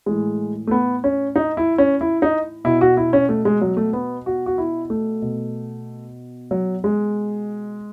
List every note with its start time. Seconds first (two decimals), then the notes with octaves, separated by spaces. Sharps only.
0.06 A2 E3 G#3
0.67 A3
0.71 B3
1.04 C#4
1.36 D#4
1.57 E4
1.78 C#4
2.01 E4
2.22 D#4
2.64 B2 E4
2.81 F#4
2.97 E4
3.13 C#4
3.29 A3
3.45 G#3
3.61 F#3
3.77 A3
3.93 B3
4.26 F#4
4.46 F#4
4.58 E4
4.90 A3
5.22 B2
6.51 F#3
6.84 G#3